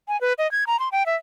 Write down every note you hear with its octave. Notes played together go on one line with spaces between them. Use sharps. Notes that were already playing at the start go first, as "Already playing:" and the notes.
G#5
B4
D#5
G#6
A#5
C6
G5
E5